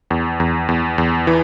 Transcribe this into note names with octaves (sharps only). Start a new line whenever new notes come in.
E2
E2
E2
E2
E3